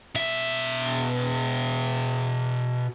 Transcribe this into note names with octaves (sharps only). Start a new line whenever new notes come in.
B2 E5